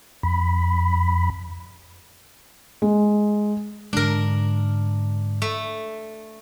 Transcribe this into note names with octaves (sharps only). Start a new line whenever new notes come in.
F2 B5
G#3
G#2 D3 G#3 D4 A#4
A3